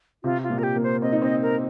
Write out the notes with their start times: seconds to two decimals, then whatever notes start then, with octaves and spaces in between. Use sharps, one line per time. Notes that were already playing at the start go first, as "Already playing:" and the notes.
0.24 C3 F4
0.43 F4
0.50 A#2
0.58 A#4
0.63 G4
0.76 A#3
0.83 C5
1.02 C4 D#5
1.12 D#4
1.22 C4 D#5
1.42 A#4